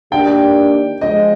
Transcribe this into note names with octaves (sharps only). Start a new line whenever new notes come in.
D#3 A#3 D4 G4 G5
F3 G#3 D#5